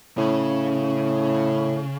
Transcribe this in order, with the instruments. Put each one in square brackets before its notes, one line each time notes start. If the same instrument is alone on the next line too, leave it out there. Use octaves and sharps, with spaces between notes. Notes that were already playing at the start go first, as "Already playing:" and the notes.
[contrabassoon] A2 [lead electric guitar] C#3